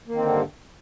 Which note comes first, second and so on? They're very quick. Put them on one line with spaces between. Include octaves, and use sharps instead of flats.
A#3 D#3 C4 D3 G2